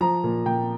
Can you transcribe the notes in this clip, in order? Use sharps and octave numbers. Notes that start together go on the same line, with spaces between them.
F3 A#5
A#2
A#2 G5